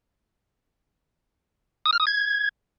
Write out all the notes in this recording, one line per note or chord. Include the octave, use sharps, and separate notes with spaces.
D#6
F6
D#6
G#6